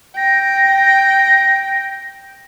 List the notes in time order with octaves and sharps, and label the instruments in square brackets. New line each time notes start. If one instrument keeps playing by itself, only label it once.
[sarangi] G5 [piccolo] A#6